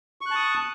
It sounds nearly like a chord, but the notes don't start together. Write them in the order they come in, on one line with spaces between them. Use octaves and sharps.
C#6 F#6 A5 D#6